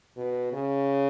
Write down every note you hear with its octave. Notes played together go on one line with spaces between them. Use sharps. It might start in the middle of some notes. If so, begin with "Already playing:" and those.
B2
C#3